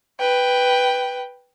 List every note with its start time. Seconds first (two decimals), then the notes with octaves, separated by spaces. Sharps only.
0.20 B4 G5